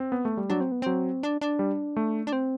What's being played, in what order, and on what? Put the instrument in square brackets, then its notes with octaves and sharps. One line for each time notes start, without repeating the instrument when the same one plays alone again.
[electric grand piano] C4
B3
A3
G3
[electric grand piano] F#3 [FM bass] D4
[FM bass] C4
B3
[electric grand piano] F#3 [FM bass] C4
[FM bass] D4
D4
[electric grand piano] G3
A3
[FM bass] D4
C4